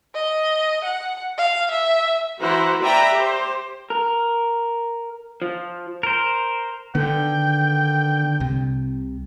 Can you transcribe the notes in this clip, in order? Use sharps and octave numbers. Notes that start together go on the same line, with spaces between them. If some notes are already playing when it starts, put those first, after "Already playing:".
D#5
F#5
F5
E5
E3 E4 F#4 C5 F#5 A#5
B4 D5 E5 G5 A#5 B5
G4 C5
A#4
F3
A#4 C5
D3 D#3 B3 G5
C2 C3